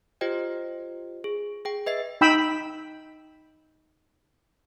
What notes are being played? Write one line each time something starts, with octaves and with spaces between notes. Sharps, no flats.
F4 G4 C5 D#5 G5
G#4
G#4 G5
B4 D#5 E5 C7
D#4 G5 B5 E6